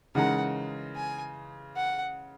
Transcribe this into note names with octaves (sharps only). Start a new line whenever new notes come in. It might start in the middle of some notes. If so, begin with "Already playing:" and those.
C#3 E3 G#3 D#4 A#4 F#5
G#5
F#5